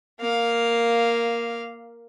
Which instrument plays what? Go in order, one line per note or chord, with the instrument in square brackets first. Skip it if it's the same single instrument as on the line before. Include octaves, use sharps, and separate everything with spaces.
[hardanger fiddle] A#3 F5